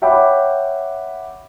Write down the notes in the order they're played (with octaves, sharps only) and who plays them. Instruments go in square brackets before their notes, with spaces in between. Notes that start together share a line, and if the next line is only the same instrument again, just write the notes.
[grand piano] C#5 E5 F#5 G5 B5 D6